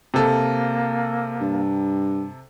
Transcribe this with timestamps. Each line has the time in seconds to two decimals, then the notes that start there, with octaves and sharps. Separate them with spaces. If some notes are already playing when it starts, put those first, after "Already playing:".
0.14 C3 A#3 A4
1.40 G2